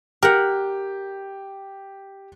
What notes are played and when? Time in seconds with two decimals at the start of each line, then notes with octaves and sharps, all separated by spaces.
0.23 G4 A#4 F#5